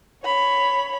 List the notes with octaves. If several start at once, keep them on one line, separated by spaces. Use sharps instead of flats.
C#5 B5